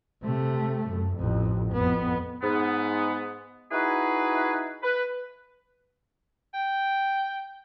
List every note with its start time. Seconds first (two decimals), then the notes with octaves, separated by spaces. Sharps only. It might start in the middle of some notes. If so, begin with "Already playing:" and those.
0.24 C3 A3
0.89 F#2
1.17 A1 F2
1.73 F2 B3
2.42 G#2 B3
3.72 D#4 E4 F#4 G#4 B4
4.83 B4
6.54 G5